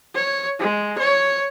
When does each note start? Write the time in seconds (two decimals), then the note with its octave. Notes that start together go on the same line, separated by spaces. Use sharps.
0.15 C#5
0.59 G#3
0.99 C#5